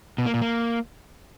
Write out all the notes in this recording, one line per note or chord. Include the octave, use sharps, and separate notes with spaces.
B2
A#3
A#2
A#3